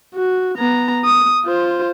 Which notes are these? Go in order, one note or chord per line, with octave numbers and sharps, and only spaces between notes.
F#4
B3 A#5
D#6
F4 C5